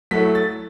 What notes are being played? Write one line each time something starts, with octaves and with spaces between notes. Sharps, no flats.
F#3 A3 E4 B6
A6